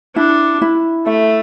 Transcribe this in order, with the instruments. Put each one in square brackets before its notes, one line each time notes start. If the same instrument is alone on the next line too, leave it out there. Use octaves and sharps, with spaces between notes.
[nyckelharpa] D4 [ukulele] E4
[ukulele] E4
[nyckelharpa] A3 [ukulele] E5